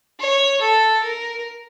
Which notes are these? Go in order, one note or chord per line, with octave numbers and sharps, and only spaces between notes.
C#5
A4
A#4